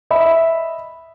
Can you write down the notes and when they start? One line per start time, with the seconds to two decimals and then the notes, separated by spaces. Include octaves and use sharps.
0.11 D#5 E5 B5